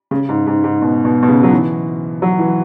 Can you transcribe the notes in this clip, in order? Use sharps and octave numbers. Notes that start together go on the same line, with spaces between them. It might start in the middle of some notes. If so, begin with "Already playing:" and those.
C#3
G#2
G#2
G#2
B2
B2
B2
C#3
F#3
E3
F#3
E3